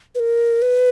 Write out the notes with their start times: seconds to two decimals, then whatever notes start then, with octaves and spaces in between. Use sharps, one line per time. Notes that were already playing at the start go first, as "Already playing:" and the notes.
0.15 B4
0.20 A#4
0.62 B4